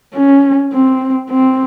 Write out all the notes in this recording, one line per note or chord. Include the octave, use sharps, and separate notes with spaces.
C#4
C4
C4